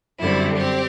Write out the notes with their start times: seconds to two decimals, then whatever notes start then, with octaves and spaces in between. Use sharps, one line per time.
0.19 F#2 D3 G3 C4 E4
0.58 C4 G4